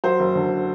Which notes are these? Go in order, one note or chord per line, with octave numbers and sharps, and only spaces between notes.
F#3 C5
F#1
D3